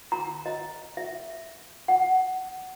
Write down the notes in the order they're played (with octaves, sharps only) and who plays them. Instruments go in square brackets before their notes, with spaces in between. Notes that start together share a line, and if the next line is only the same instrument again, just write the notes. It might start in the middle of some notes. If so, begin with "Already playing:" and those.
[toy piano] A#5
D#5
E5
F#5